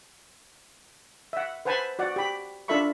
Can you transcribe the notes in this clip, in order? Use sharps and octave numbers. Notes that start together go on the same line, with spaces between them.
E5 F#5
B4 C5 F#5 G#5 A5 B5
F#4 D5 F#5
G4 B5
D4 F4 A4 E5 B5 C#6